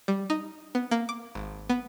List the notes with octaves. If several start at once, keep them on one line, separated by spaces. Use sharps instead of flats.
G3
D#4
B3
A#3
D6
G#1
B3